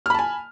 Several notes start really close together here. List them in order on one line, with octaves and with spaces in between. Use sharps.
F6 B5 A5 G#5